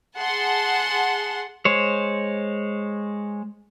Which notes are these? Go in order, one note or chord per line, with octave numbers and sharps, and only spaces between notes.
G#4 F#5 A5 C6
G#3 C5 C#5